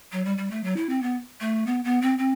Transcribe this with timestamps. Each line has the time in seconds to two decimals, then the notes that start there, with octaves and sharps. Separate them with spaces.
0.12 F#3
0.25 G3
0.38 G3
0.51 A3
0.64 F#3
0.76 E4
0.89 C4
1.02 B3
1.41 A3
1.67 B3
1.85 B3
2.02 C4
2.18 C4